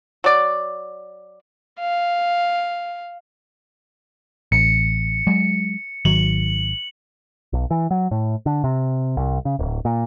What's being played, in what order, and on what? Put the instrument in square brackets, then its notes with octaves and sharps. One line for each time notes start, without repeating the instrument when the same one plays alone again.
[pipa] F#3 D5
[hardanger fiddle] F5
[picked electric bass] A1 [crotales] C#7
[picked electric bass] F#3 G#3
[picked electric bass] G#1 D#3 F#3 [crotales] F#7
[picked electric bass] B1
E3
F#3
A2
D3
C3
C2
C#3
D1
A#2